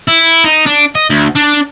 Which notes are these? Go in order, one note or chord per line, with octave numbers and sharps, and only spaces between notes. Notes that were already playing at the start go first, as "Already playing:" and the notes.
E4
D#4
D4
D#5
D2
D4